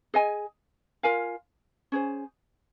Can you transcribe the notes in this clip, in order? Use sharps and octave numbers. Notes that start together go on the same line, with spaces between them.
G#4 D#5 G#5
F4 A#4 F5 G#5
C#4 G#4 C5